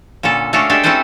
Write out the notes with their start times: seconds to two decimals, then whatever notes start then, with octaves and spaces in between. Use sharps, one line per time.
0.23 A#2 D3 C#4 A4
0.53 A3 C#4 D4 F#4 A4 F5
0.69 G#3 D4 G4 A4 E5
0.83 C4 C#4 E4 A4 B4 C5